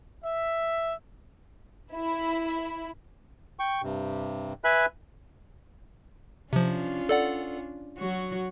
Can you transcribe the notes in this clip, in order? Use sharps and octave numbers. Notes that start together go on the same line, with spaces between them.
E5
E4
G5 C#6
G2 C3
B4 E5 G#5 B5 F#6
C3 F3 C#4 D4 F4
A4 D5 F#5
F#3 F#4